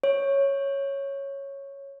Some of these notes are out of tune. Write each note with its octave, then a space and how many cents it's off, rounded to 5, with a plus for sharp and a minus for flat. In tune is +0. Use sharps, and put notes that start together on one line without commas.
C#5 -5